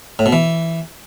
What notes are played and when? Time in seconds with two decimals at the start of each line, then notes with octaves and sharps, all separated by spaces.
0.19 A2
0.26 B2
0.33 E3